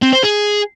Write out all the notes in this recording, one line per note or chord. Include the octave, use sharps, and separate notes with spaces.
C4
C5
G#4